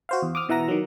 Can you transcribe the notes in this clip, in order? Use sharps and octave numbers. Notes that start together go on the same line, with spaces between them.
F#4 C5 F5
E2
D6 D#6 F6
B2 E3 E5 F#5 A#5 A#6
D#3 F#3